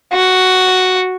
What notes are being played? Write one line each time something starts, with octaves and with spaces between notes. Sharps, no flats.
F#4